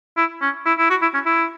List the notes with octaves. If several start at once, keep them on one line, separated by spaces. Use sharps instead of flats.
E4
C#4
E4
E4
F#4
E4
C#4
E4